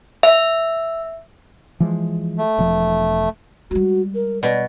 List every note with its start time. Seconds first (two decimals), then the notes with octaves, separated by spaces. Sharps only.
0.23 E5
1.80 E3 F3 G#3
2.38 A3
2.59 E1 F3
3.71 G3 G#3 F#4
4.15 A#4
4.43 B2 D5